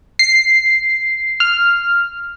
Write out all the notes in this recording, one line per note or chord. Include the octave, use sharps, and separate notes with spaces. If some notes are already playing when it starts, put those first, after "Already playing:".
C7
F6